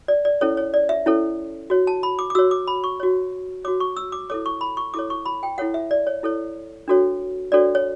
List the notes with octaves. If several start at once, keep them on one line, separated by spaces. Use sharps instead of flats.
D5
D5
C#4 E4 A4 C#5
C#5
D5
E5
C#4 E4 A4 C#5
F#4 C#5
A5
B5
D6
D6
F#4 C#5 E6
D6
B5
C#6
F#4 C#5
F#4 C#5 D6
C#6
E6
D6
E4 A4 C#5 D6
C#6
B5
C#6
E4 A4 C#5 D6
C#6
B5
G5
E4 A4 C#5 F#5
E5
D5
C#5
E4 A4 C#5
D4 F#4 A4 C#5
D4 F#4 A4 C#5 D5
C#5